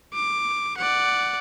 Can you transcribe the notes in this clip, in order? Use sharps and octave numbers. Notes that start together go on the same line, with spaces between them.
D6
D5 F#5